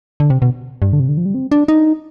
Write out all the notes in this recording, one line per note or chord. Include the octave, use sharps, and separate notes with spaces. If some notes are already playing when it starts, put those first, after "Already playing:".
D3
C3
B2
G2
D3
C3
D3
F3
G3
C4
D4
D#4